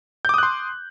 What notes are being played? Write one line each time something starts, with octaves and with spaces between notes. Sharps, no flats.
C6 D6 D#6 F#6 G6